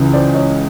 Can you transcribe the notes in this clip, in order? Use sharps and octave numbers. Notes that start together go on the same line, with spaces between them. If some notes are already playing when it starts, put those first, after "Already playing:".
Already playing: C#2 C#3 E3
C5 D5
C#5 D#5